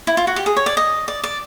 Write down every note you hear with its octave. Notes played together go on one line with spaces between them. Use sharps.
E4
F4
F#4
G4
G#4
C#5
D5
D#5
D5
D5